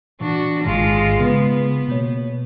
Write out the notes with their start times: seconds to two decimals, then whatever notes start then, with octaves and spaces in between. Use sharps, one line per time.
0.21 A#2 E3 D4 F#4
0.64 A1 G#2 D#3 G#3 F4
1.21 C#3 G#3 B3 B4
1.88 B2 A#3 C#5